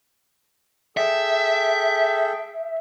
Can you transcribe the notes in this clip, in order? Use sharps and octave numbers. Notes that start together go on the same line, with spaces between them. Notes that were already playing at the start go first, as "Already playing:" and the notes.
G#4 A4 E5 G5